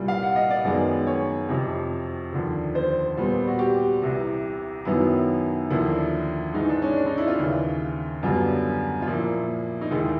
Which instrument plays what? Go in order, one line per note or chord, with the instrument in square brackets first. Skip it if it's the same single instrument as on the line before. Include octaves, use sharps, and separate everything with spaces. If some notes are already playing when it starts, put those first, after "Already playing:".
Already playing: [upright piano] C2 A#2 G3
F5
F#5
D#5
D5
F#2 D#3 G#3 B3
C#5
F2 C3 F3
D#2 D3 F3
C5
A#2 G3 B3
F#4
G4
C2 C3 E3
F#2 D#3 F#3 B3 E4
D#2 D3 F3 A#3 E4
G#2 E3 G#3 D#4
D4
C#4
D4
D#4
E4
F4
D#2 C#3 E3
F#2 D3 G3 B3 F4
F4
A#2 F3 A#3 E4
D#4
D#2 D#3 G#3 E4